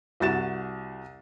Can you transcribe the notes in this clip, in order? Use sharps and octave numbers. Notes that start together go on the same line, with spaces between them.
C2 F#4 A6 E7